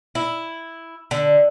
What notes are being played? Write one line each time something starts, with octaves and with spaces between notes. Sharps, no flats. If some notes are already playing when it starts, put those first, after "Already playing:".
E4
D3